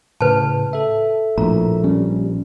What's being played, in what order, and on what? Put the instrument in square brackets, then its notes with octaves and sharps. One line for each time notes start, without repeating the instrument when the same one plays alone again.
[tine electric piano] A2 C#3 [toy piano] B4 A5
[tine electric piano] A4 E5
[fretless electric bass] A#1 [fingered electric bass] A2 [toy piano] A#5
[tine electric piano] G3 [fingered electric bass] C#4